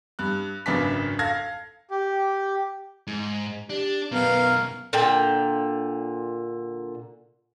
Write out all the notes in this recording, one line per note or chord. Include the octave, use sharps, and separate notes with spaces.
G2 F#6
G#1 F#2 C#3 B3 D4 B6
A4 F5 G#6 A#6
G4
G#2
D4 G4
F#2 B2 B3 A#4 F5
A#2 D3 G5